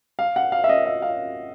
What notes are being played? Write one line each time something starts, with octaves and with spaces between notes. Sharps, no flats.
F5
F#5
F5
E5
D#5
E5
F5